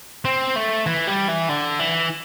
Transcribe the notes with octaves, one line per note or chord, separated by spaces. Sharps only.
C4
A3
E3
G3
E3
D3
E3